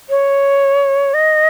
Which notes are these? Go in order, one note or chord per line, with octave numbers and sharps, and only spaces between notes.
C#5
D#5